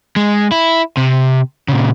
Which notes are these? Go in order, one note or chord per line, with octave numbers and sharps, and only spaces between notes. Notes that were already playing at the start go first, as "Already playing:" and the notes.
G#3
E4
C3
A#2 C#3